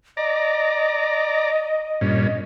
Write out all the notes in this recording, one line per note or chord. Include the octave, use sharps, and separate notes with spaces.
D5 D#5 A#5
G2 A#2 C#4